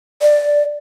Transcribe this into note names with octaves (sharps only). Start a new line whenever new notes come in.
D5